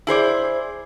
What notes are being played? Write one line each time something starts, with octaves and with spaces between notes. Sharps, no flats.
E4 G#4 C5 D5